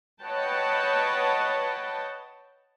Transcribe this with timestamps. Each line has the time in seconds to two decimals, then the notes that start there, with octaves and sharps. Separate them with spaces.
0.23 B4 C#5 D#5 F#5 G5 A5